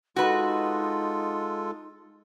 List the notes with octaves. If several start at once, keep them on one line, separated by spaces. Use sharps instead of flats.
G#3 D#4 F4 F#4 A4 B4